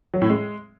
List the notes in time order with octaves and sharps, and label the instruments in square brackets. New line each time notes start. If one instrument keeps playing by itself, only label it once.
[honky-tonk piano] F#3
A2
G#3